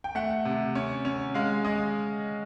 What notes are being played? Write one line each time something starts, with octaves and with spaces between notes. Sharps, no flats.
G5
A3 F#5
C3
C#4
C#4
G#3 F5
G#3 D#5